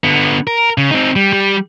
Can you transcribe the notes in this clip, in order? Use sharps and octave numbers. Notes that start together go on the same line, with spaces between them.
D3 B3
A#4
C#3
C4 D#4
G3
G3